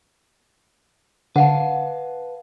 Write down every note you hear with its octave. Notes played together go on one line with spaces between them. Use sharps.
D3 B4 F5 F#5 A5